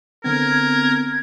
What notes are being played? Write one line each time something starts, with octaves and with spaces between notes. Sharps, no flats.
D3 B3 C4 A#4 G#6